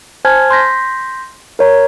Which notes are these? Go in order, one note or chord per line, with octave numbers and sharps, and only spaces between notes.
C5 G#5 A5 F6 G#6
C6 G6 A#6 B6
A#4 C#5 A#5